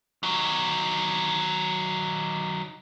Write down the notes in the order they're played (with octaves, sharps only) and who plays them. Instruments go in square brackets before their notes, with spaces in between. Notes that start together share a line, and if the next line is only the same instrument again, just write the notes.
[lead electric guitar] D#3 F#3